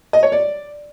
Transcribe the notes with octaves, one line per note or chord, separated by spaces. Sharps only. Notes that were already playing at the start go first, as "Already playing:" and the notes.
D#5
C#5
D5